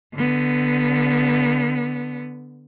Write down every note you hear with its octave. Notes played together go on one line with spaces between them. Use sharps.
D3 B3